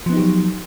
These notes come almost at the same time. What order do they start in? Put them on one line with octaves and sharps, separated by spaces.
F3 B3 D#4 G4 F#3